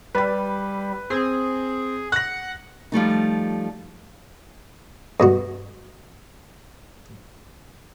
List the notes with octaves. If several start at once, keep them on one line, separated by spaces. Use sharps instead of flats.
G3 B4 B5
C4 G#4
F#5 F#6 A#6
F3 G3 A3 D#4
G2 B2 F#4